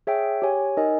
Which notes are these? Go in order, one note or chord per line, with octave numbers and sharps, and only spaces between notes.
G#4 C#5 E5 G5
G4 C#5 G#5
D#4 A#4 D#5 G#5